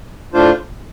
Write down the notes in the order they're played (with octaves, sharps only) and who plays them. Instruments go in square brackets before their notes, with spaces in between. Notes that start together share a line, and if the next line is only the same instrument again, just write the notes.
[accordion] A2 A3 D4 F4 C5